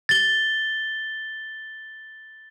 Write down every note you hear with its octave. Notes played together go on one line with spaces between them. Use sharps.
A6 G7